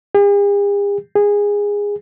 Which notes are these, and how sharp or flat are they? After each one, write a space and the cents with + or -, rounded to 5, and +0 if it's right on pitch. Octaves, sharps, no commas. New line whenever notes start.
G#4 -45
G#4 -15